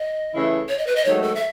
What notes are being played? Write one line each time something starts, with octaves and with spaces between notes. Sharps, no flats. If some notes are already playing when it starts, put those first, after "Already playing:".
Already playing: D#5
C#3 E3 A3 E4
C#5
D#5
B4
D#5
G#2 D#3 F#3 A3 C#5
A4
E5